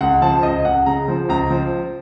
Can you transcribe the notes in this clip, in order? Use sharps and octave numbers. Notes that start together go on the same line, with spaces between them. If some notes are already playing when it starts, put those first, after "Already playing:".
C#2 F#5
F3 A5
C#2 D#5
C#2 F#5
C#3 A#5
F3
C#2 A#5
F3